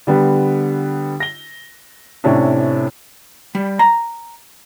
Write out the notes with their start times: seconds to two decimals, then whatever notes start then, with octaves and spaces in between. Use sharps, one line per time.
0.07 D3 G3 B3
1.20 A#6 G7
2.24 A2 C3 A3 C#4 D4
3.55 G3
3.79 A#5